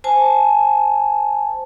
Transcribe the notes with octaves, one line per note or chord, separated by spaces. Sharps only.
C5 G#5 A5